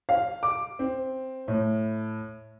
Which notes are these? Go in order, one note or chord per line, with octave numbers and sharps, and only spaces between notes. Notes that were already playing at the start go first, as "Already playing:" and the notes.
F5
D6
C4
A2